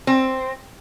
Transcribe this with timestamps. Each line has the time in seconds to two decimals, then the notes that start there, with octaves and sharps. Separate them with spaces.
0.07 C4